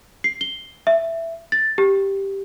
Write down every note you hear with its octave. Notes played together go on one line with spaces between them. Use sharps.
C7
G7
E5
A6
G4